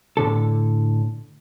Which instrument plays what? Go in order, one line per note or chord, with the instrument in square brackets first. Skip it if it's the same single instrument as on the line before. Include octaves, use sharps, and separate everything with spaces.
[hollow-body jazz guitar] A2 D3 A4